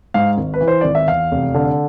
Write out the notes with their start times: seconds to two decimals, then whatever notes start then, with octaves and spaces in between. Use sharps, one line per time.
0.14 G#2 F5
0.37 G#1
0.54 B4
0.61 E3
0.68 C5
0.81 G#1 D5
0.95 E5
1.07 E2 F5
1.31 F1
1.54 D3